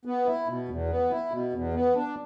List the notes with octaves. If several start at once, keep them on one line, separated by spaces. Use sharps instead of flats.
B3
E4
B2
E2
B3
E4
B2
E2
B3
D4